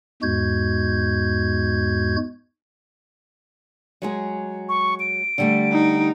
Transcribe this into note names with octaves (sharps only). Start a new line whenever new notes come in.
E2 G#2 G#3 F#4 G6 G#6
F#3 G#3 G#4
C#6
D7
D3 G3 A3
D#4